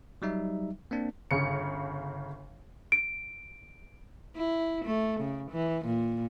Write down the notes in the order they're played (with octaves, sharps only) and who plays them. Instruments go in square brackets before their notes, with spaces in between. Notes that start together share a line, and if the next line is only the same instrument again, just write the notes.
[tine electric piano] F#3 G3 D#4 E5
A#3 C4 D4
[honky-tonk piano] G1 C#3 C#7
[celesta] D7
[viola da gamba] E4
A3
C#3
E3
A#2